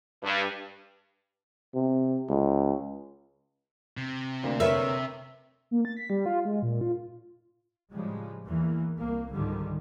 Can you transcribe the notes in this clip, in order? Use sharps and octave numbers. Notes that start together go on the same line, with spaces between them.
G2
C3
C#2
C3
D2 A#3 D4
A#4 B4 C#5 E5
A#3
A6
B6
G3
F4
G#3
A#2
F4
A2 C#3 F3 G3 G#3
E2 E3 A#3
C2 A#3
C#2 G#2 D3 D#3 F3 G3